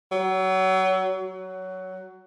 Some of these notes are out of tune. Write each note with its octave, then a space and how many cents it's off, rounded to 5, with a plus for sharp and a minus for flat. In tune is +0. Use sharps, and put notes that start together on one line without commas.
F#3 +30
F#3 +15